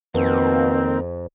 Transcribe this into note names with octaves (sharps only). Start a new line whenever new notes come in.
F2 B2 D#3 A#3 C4 A#4